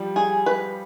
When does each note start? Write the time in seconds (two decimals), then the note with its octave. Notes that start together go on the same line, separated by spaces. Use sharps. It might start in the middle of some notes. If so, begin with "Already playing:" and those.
Already playing: F3 G3
0.16 G#4
0.46 B4